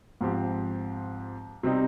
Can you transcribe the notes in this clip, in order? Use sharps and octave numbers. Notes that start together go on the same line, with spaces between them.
G#2 F3 C4 G4
C3 G3 C4 D#4